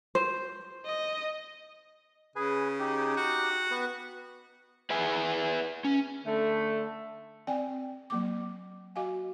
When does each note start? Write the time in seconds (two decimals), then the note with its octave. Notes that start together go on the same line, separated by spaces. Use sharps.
0.15 C5
0.86 D#5
2.36 C#3 G#4 B4 G#5
2.80 D#4 G4
3.17 F#4
3.71 B3 B4
4.90 G#4 B4 E5 G#5
5.85 C#4
6.26 D3 A3
7.47 C4 D5 G5 G#5
8.10 F#3 A#3 D6
8.96 F#4 D#5 F5 G#5